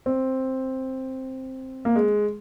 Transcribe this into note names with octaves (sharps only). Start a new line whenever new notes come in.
C4
A#3
G#3